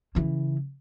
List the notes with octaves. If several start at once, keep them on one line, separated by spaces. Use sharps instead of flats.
C#3 E3